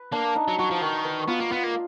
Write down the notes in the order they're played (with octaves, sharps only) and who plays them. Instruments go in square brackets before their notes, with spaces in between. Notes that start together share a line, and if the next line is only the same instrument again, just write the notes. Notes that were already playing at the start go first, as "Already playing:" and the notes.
Already playing: [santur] B4
[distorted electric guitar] A#3 [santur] D4
[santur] D#4
[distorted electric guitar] F#3
[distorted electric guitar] F#3 [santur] F#4
[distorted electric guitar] F3
[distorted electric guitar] D#3 [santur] F#4
[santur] B4
[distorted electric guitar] B3 [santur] F4
[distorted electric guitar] A#3
[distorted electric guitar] B3 [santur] F4
[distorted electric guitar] A#3